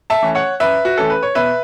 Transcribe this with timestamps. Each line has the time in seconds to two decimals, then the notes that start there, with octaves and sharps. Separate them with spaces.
0.10 E5 A5
0.22 E3 A3 C#4
0.35 C#5 F#5
0.60 F#2 B4 E5
0.85 F#4
0.97 E3 A3 C#4 A4
1.10 B4
1.23 C#5
1.35 B2 B4 E5